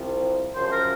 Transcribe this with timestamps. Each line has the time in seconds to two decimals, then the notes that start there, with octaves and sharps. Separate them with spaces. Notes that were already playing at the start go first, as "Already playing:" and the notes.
Already playing: C2 C3 F3
0.55 F#2 C#3 F3 C5
0.66 C5
0.72 A#4